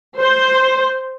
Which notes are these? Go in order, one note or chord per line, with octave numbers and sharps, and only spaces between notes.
C5